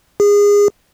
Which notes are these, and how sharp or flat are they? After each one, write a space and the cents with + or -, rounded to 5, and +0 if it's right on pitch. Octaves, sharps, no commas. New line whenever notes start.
G#4 -25